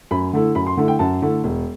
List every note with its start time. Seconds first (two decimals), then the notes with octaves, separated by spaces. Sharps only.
0.11 F#2 B5
0.33 D3 A3 E4
0.55 F#2 B5
0.67 C6
0.77 D3 A3 E4
0.88 G5
0.99 F#2 A5
1.22 D3 A3 E4
1.44 E1